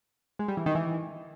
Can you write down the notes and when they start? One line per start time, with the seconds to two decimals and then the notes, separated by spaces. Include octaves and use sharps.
0.39 G#3
0.48 G3
0.57 E3
0.66 D#3
0.75 E3